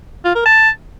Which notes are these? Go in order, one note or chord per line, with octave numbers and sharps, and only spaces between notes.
F4
A#4
A5